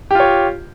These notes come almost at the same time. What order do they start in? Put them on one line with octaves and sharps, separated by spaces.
G4 F4 C#5